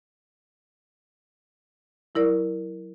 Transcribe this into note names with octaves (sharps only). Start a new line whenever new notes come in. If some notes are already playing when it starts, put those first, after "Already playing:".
F#3 E4 A#4 D5